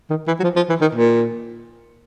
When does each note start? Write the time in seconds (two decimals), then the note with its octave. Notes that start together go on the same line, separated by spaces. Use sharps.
0.10 D#3
0.27 E3
0.40 F#3
0.44 F3
0.56 F3
0.69 E3
0.81 D#3
0.95 A#2